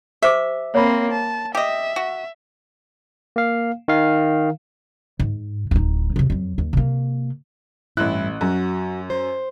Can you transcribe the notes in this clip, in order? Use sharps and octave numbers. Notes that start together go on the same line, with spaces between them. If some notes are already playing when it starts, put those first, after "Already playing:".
G4 C5 E5 D6
A#3 C4 C#5 B5
A5
G4 D#5 E5
F#4
A#3 F5
D#3 F5
G#2
D1 D#4
F2 C3
F2 F#3
D#2
C3 A#3
A1 G2 E4 F#6
F#2 F#4
C5